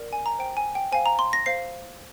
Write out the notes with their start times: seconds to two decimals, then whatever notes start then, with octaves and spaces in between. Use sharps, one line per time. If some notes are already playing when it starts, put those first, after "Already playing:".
Already playing: A#4 D5
0.13 G#5
0.26 A#5
0.39 C5 G5
0.57 G#5
0.75 G5
0.92 C5 F5 G#5
1.06 A#5
1.19 C6
1.33 A#6
1.46 C5 F5 C7